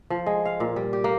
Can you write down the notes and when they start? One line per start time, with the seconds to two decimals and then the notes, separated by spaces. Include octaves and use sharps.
0.10 F3
0.26 G#3
0.45 F5
0.60 A#2
0.76 G3
0.93 G4
1.04 A#3